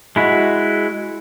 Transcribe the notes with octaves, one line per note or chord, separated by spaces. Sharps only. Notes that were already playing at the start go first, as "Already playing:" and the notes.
G#3 E4 F#4